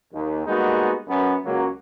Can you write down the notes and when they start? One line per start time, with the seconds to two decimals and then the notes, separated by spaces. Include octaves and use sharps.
0.13 D#2
0.45 G3 G#3 A#3 B3 D#4 F#4
1.07 F#2 B3
1.45 C#2 F#3 A#3